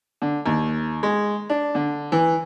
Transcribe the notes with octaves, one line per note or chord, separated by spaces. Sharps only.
D3
D#2
G#3
D4
D3
E3